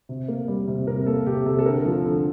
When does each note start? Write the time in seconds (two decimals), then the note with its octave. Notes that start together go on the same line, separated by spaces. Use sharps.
0.09 C3
0.28 A#3
0.48 G3
0.67 C3
0.87 C3 A#4
1.06 A#3 A4
1.26 C3 G4
1.46 C3 A4
1.59 A4
1.66 D3 A#4
1.85 F3
2.05 D3